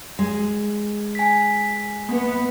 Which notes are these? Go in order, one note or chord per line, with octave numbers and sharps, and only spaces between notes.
G#3
G#5 B6
A#3 B3